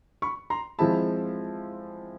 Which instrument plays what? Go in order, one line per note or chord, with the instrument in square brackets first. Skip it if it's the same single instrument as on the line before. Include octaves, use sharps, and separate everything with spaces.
[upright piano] B5 C#6
A#5 C6
[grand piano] F3 G#3 C4 E4 [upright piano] A5 B5